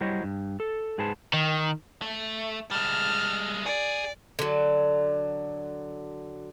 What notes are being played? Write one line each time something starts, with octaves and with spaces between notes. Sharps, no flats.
F#3 G3 E4 C5 C#5 D#5
G2
A4
G#2 G#4 B4 C5 A5
D#3
A3
G3 G#3 A5 F6
G#4 D5
D3 F#3